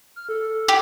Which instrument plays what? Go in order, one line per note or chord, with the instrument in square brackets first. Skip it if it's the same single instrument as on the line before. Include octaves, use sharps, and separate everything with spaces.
[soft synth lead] F6
A4
[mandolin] G4